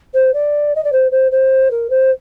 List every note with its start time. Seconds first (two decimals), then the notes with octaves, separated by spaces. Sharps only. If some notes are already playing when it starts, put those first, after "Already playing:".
0.14 C5
0.34 D5
0.75 D#5
0.84 D5
0.92 C5
1.11 C5
1.32 C5
1.71 A#4
1.90 C5